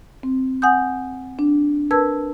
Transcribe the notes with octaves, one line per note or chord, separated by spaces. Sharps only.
C4
F#5 G#5 D#6 G6
D4
A#4 B4 A5 E6 G#6